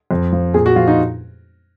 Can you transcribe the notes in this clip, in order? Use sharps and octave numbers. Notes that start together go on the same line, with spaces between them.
F2
F3
A#2 G#4
F#4
F3 F4
D#4